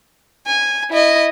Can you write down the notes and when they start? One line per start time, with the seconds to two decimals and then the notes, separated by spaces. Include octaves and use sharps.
0.47 G#5
0.91 E4 D#5